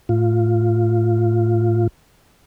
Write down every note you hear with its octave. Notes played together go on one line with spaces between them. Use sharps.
A2 F4